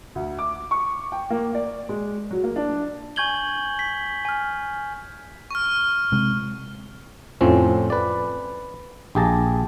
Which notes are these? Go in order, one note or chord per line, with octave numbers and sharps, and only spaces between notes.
D2
D6
C#6
G5
A#3
D5
G#3
F#3
A#3
D4
G#5 C#6 G6 G#6 F#7 G7
B6
G#5 F6
C#6 F6
C3 G#3
F2 A2 F3 C4 C#4
B4 D5
A#1 G4 G#4 A5 A#5